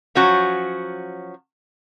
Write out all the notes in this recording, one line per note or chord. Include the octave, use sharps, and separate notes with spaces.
F3 F#3 C#4 F#4